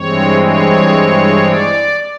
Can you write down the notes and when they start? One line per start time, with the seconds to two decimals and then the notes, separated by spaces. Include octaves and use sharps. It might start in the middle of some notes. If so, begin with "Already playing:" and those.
Already playing: G2 E3 G#3 C4 C#5
0.41 C#5
1.43 D5